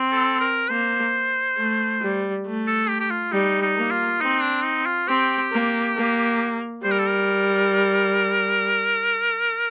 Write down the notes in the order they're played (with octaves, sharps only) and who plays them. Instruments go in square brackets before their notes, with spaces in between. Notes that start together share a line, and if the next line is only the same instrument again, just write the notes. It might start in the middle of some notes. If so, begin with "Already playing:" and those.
Already playing: [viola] C4
[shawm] A4
A#4
[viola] A#3 [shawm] C5
[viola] A3
G3
A3
[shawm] A4
G4
G4
F4
[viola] G3 [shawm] D#4
[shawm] D#4
[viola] A#3
[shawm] F4
[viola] C4 [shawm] D#4
[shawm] D4
D#4
F4
[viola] C4 [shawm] G4
[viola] A#3
A#3
[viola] G3 [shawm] C5
[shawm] A#4
A4
A#4